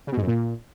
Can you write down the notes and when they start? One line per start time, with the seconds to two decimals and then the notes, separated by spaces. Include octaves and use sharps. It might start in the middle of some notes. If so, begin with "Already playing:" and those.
0.07 C#3
0.12 B2
0.17 G#2
0.22 F#2
0.27 A#2